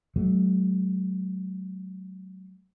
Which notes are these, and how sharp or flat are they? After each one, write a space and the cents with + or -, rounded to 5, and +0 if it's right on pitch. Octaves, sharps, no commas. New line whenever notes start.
F#3 +20 A3 -40